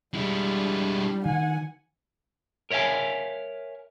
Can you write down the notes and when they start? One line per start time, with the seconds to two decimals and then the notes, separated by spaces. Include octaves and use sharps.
0.14 G3 G#3 D4 E4
1.25 D#3 F#5 G#5
2.71 A#4 C#5 E5 F5 G#5